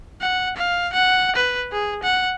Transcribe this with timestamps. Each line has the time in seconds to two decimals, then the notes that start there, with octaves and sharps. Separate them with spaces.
0.21 F#5
0.57 F5
0.93 F#5
1.36 B4
1.72 G#4
2.03 F#5